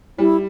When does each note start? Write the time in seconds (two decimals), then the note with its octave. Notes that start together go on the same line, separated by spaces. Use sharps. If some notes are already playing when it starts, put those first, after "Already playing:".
0.18 G3 E4